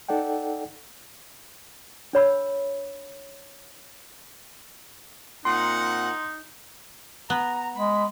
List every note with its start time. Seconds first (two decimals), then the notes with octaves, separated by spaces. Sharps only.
0.09 D#4 A4 D5 F#5 G5
2.13 D4 C#5 B5 E6
5.45 A#2 C4 D#4 F#5 C6
7.30 B3 A#5
7.76 G#3 B5